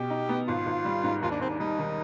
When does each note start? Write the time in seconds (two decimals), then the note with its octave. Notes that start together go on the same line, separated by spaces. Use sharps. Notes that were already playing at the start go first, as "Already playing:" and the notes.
Already playing: B2 G4
0.10 D#4
0.29 B3
0.48 G#1 F4
0.66 G#1
0.85 G3
1.04 G#2
1.22 D#2 F4
1.32 D4
1.41 D#2 C4
1.50 D4
1.60 G3 D#4
1.79 D#3